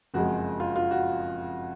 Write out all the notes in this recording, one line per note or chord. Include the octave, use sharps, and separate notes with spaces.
F#1 F2 F3 G#3 F#4
F4
F4
F#4